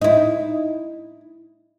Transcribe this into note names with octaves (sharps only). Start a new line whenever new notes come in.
D#4 E4